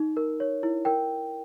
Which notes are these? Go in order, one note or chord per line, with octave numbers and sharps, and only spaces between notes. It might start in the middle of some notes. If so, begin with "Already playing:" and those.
Already playing: D#4
A#4
C#5
E4
A#4 G5